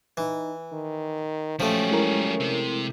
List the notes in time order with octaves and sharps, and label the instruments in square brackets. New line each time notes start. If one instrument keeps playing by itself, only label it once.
[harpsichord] E3 [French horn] D#4
[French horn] D#3
[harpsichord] F3 A3 [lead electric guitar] F#3 G4 [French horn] C#4
[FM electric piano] G#3 E4 A#4
[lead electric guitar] C3 C4